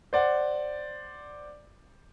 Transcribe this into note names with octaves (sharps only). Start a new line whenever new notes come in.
C5 D5 F#5